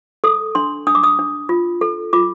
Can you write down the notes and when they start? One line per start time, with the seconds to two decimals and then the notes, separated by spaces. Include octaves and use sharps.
0.24 A4 D#6
0.55 D4 C6
0.87 D4 D#6
0.95 D6
1.03 D#6
1.19 D4
1.49 F4
1.81 A4
2.13 F4 D6